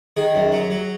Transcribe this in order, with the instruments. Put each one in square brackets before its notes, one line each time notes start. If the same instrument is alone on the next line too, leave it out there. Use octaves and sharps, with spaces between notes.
[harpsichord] D#3 G#4
F#2
F#3
F#3